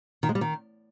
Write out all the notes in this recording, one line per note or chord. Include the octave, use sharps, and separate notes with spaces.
D#3
G#3
G3
D#3